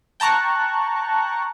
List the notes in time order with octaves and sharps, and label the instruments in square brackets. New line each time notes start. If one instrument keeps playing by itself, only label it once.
[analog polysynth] G5 A5 A#5 C#6 F#6